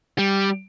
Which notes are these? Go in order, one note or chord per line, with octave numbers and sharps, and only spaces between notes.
G3